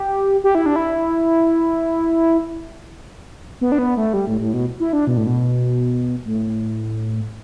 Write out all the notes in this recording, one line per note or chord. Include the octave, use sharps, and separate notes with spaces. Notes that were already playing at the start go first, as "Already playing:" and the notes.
Already playing: G4
G4
E4
D4
E4
B3
D4
B3
A3
G3
A2
A2
B2
E4
D4
B2
A2
B2
A2